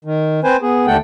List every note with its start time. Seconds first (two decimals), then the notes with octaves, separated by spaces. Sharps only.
0.05 D#3
0.44 C4 B4 C5 G#5
0.62 B3 G#4
0.87 D#2 D3 A3 A4 F#5 G5